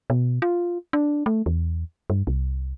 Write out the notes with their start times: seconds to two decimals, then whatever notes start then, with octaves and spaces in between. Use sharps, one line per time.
0.10 B2
0.42 F4
0.93 D4
1.26 A3
1.46 E2
2.10 G2
2.27 C2